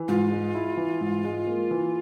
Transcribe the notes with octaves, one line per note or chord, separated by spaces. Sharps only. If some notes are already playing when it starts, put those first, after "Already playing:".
Already playing: E3
G#2 F4
G#3
E4
E3
G#2
G#3
A#3
E3